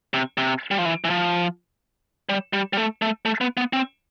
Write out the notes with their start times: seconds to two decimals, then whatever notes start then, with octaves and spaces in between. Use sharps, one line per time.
0.14 C3
0.38 C3
0.71 G3
0.78 F3
0.85 E3
1.04 E3
1.10 F3
2.29 G3
2.53 G3
2.73 G3
2.77 A3
3.02 A3
3.25 A3
3.41 B3
3.57 B3
3.73 C4